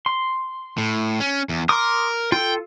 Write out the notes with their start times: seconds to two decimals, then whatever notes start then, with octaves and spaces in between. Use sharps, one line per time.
0.06 C6
0.78 A2
1.20 C#4
1.49 E2
1.69 A#4 C6 D6 D#6
2.32 F4 A4 G5